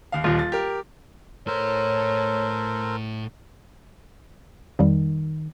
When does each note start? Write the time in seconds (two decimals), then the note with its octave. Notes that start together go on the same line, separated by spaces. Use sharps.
0.12 D#2 F5
0.24 D#1 D#2 F4
0.39 A6
0.52 G4 A#4
1.47 A2 A4 A#4 C5 C#5 A5
4.79 F2 D#3 G3